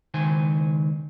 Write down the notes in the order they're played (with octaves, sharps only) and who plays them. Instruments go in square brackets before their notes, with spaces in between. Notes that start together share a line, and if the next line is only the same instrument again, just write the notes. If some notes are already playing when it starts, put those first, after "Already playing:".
[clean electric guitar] C#2 D#3 C5 G#5